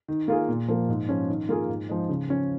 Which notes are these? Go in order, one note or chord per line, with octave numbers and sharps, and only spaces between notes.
D#3
A#3 F4 G#4
A#2
F3 A#3
G#2
F3 C#4
D#3
A#3 F4 G#4
G#2
F3 G#3 D#4
C#3
F3 C#4